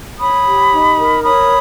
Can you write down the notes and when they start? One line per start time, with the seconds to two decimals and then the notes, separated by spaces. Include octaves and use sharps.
0.20 C#5 B5 D#6
0.46 G4
0.72 D#4
0.98 A#4
1.24 C#5 B5 D#6